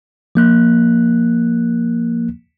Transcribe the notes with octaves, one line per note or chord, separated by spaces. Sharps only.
F3 A#3 F#6